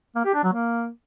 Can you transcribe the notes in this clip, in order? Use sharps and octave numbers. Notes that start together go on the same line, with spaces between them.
A#3
G4
D4
F#3
A#3